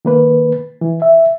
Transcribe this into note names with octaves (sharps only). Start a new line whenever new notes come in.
D#3 A#3 B4
E3
E5